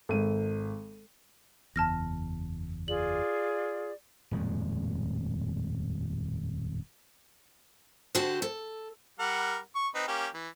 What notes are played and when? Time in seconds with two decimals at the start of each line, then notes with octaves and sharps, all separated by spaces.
0.09 G#1 G#3 A4 D#7
1.76 F#1 E2 A5 F6 A#6
2.88 F4 G#4 D5 F#7
4.31 D#1 F2 A2 G#3
8.15 D3 F#4 G4 C5 A5
8.42 A4
9.19 G3 A#4 F#5
9.75 C#6
9.95 C4 D#4 B4
10.08 A#3 C#4 G4
10.34 E3